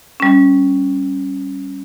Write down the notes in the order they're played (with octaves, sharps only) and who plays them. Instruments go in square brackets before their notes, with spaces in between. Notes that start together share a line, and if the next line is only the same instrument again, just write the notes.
[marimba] G3 C#4